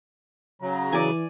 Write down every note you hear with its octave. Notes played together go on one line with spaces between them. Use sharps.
C#3 F#3 A#5
E3 D5 G#5